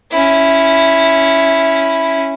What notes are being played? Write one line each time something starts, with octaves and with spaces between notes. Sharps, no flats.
C#4 E4